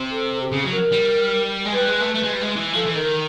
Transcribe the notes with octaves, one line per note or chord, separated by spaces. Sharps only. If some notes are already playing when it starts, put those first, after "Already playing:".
Already playing: C3
A4
G4
C#3 G#4
F#3
A#4
G3
G#3
G3 B4
G#3
A3
A3 B4
G#3
G3
G#3
E3
F3 A4
E3
D#3 A#4